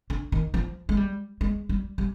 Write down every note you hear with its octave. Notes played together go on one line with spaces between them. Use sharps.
D3
D#3
F3
G#3
G3
G#3
G3
G3